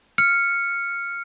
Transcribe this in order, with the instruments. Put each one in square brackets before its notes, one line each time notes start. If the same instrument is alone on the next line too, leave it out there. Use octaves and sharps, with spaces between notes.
[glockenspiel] F6 C#7